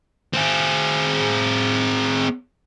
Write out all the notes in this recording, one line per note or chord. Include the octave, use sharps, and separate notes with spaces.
C4 G#4